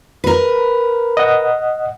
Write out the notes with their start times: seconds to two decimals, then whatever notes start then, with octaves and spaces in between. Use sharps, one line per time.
0.24 A#4 B4
1.17 D#5 F#5